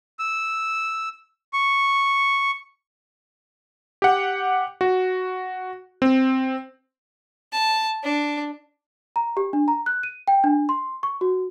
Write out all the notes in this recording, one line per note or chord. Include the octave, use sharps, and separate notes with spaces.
E6
C#6
G4 F#5
F#4
C4
A5
D4
A#5
G4
D4
A#5
F#6
D#7
G5
D4
C6
C#6
F#4